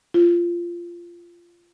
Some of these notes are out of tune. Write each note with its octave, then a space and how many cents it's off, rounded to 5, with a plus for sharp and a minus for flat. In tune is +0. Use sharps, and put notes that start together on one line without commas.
F4 -15